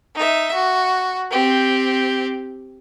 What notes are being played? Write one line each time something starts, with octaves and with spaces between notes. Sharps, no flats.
D#4 E5
F#4
C4 G4